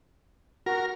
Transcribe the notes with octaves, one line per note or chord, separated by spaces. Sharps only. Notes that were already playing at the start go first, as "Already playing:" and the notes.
F#4 A#4